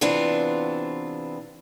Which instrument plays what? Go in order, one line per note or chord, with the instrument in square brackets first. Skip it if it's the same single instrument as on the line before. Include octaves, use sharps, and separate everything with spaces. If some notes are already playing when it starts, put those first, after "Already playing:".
[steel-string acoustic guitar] C3 E3 B3 C4 D4 F4